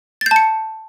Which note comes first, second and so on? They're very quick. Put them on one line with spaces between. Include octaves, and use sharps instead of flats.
A6 G6 A5 C#7